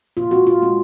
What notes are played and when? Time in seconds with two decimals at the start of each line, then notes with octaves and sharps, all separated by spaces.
0.17 A#2 F4
0.31 G#3 C#4 F#4
0.47 A#2 F4
0.62 G#3 C#4